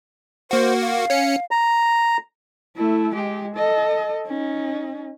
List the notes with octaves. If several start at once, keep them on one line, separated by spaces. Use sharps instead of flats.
A#3 F#4 C5
F5
C#4 C#7
A#5
A3 E4
G#3 G4
A4 D#5
C#4 D#4